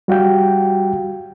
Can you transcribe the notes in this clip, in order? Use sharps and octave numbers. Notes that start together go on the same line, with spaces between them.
G3 F#4 F5 G5